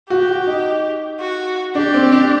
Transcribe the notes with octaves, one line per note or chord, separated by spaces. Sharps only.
F#4 G4
F#4
D#4
F#4
D4 G4
C4
D4